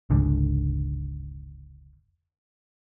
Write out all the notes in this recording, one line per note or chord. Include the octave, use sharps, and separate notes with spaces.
F1 C#2 G#2 D3